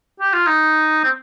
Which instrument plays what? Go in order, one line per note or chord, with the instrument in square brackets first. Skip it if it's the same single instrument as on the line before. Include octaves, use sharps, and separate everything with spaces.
[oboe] G4
F4
D#4
C4